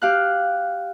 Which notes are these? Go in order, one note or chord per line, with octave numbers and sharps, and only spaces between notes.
G4 F5 F#6